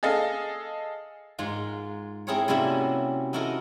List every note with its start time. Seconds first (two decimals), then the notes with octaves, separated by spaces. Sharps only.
0.03 G#4 A4 D#5 F5
1.38 G#2 G#3 F4 A#4
2.27 C4 E4 G#4 A#4 C5 C#5
2.48 C3 G3 A#3 C#4 E4 F#4
3.33 D#4 E4 F#4 A4 A#4 D#5